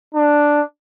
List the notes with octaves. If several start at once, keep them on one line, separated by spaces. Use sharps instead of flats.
D4